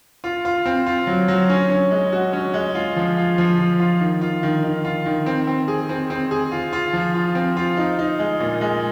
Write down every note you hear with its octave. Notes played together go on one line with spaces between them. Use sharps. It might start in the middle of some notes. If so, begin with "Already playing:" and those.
F4
F4
C4
F4
F#3
F#3
C#4
C#4
G#3
F#4
C#4
G#3
F4
F3
F4
F3
F3
F4
D#3
F4
D#3
D#3
F4
D#3
C4
C4
G#4
C4
C4
G#4
F4
F4
F3
F4
C4
F4
D#4
D#4
G#3
A#2
G#3